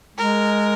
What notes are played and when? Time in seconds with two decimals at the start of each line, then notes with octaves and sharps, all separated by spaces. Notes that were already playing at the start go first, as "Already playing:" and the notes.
0.17 G#3 A#4